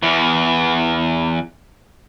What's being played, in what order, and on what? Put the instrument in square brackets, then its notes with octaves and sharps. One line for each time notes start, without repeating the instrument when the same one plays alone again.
[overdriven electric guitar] E2 E3